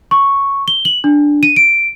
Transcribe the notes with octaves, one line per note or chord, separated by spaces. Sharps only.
C#6
G7
F#7
D4
D#7
D7